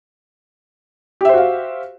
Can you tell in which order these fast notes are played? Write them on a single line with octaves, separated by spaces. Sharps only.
G4 E5 C5 F#4 F5